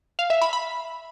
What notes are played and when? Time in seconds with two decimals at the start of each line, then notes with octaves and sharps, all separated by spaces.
0.19 F5
0.30 E5
0.41 B5
0.53 B5